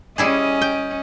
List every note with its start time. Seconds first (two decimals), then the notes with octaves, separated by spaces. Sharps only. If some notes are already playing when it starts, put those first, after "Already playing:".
0.18 G3 C#4 E4 G#4 D#5
0.62 G5